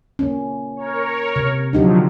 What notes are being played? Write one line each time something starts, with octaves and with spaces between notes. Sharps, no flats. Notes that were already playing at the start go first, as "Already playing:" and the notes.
A#3 C#4
A#4 C#5
C3
D3 F3 F#3 D4 D#4 G4